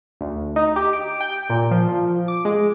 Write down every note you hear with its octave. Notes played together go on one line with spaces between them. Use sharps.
D2
D#4
G4
D7
G5
A#2
F3
F3
D6
G#3